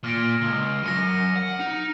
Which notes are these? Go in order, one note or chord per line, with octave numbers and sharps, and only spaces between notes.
A#2 F6 A#6 D7
C#2
F#2 A#6 C#7 D#7
F#5
D#4